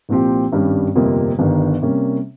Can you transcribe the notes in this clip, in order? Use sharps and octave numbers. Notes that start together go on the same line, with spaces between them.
C2 A#2 F3 C4 G4
G#1 G2 G3 C#4
G1 F2 C3 G3 A#3
G1 G2 D#3
C3 G3 A#3 C#4